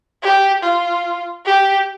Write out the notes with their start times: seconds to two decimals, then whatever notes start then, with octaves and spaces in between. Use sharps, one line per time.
0.22 G4
0.63 F4
1.45 G4